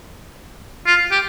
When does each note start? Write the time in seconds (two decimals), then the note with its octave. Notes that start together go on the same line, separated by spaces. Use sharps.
0.87 F4
1.11 G4